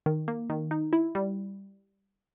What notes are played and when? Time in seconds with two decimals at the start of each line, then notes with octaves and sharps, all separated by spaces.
0.06 D#3
0.28 A#3
0.50 D#3
0.71 D#4
0.93 E4
1.15 G3